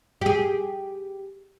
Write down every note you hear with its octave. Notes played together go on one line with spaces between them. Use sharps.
G4 G#4